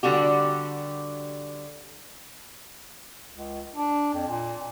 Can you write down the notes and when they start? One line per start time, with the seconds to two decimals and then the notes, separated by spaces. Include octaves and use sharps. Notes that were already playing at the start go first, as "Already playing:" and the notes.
0.03 D3 G3 F#4 G4
3.31 C#2
3.76 D4
4.14 F2
4.28 A#2